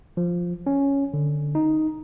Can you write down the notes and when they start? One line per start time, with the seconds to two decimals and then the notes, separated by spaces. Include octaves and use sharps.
0.17 F3
0.67 C#4
1.14 D3
1.55 D#4